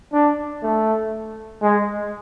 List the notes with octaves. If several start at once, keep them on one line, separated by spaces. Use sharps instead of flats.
D4
A3
G#3